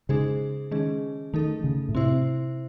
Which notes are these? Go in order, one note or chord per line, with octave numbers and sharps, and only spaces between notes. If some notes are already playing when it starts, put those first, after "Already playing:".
C#3 G#3 D#4 G#4 C5
D#3 G#3 C#4 G#4
D#3 A3 D#4 A4
C#3
A2
C3 C4 E4 C5